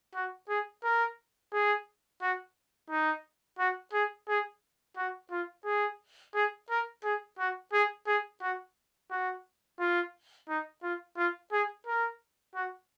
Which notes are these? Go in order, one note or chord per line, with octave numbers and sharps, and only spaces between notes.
F#4
G#4
A#4
G#4
F#4
D#4
F#4
G#4
G#4
F#4
F4
G#4
G#4
A#4
G#4
F#4
G#4
G#4
F#4
F#4
F4
D#4
F4
F4
G#4
A#4
F#4